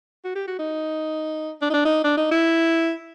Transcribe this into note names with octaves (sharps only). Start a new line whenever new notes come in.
F#4
G4
F#4
D#4
D4
D#4
D4
D#4
D4
D#4
E4